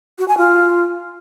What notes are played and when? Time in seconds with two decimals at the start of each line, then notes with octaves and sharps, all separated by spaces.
0.18 F#4
0.28 G#5
0.38 F4